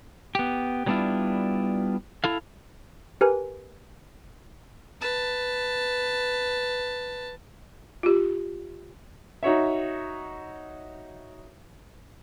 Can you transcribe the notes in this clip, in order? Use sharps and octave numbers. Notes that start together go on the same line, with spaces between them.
B3 G4
F#3 G3 B3 D4 E4 F4
E4 A4 F5
G4 A#4 B4 G#5
B4 A5
F4 G4
D#4 F#4 C#5 E5